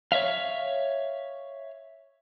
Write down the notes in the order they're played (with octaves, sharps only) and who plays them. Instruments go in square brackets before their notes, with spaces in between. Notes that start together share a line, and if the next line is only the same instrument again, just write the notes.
[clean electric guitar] C#5 D5 E5 F5